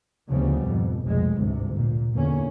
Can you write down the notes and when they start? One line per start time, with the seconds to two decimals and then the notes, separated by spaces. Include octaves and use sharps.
0.29 D2 C#3 F3 G3 B3
0.64 F2 G#2 B2
1.02 F1 B1 G#3
1.38 G1 D2 G#2 C3
1.75 A#2
2.14 E2 A#2 D3 A#3 C#4